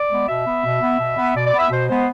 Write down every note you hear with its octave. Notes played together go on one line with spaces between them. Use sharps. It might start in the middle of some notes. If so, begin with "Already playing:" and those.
Already playing: D5
G#3 B3
B2 E5
B3
B2
B3
B2
B3
B2 D5
D5
B3
E5
B2 C5
G#3 B3 C5